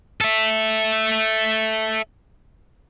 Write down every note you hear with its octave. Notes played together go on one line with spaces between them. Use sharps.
A4 E5